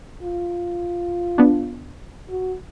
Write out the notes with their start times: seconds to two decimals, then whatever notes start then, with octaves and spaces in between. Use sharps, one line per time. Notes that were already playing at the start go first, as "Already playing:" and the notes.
0.23 F4
1.38 B3 D4
2.30 F#4